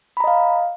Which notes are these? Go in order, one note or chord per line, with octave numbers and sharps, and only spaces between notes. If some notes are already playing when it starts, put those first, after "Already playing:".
D#5 F5 A#5 B5